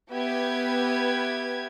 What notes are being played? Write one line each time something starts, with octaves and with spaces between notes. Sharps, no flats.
B3 G4 B4 E5 G#6